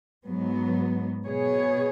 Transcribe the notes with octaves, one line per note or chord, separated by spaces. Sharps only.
G#2 F#3 B3
B2 B3 G#4 C#5